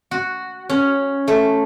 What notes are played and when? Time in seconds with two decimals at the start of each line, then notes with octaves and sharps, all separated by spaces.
0.11 F#4
0.69 C#4
1.28 A3